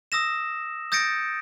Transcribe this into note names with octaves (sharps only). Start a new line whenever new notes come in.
D#6 E6 A#6 E7
D#6 G6 A6 A#6 C#7 D7